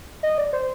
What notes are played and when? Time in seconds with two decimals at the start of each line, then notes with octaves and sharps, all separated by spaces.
0.23 D#5
0.38 D5
0.53 C5